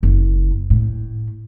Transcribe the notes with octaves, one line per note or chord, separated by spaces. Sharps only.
F#1
A2